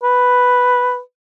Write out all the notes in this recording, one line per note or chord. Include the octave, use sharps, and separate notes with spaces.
B4